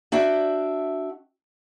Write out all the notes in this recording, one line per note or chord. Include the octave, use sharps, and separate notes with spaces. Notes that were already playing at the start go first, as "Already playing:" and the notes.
D4 F#4 E5 G5